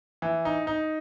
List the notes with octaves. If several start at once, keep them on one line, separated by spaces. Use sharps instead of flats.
E3
D#4
D#4